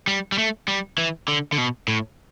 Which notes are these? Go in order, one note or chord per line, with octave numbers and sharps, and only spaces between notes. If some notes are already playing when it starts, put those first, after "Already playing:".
G3
G3
A3
G3
E3
D3
D3
B2
A2